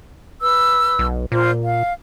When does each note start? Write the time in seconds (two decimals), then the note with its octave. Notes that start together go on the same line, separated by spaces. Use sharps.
0.41 B4 E6
0.99 B1
1.32 A#2 F4 C5
1.62 F5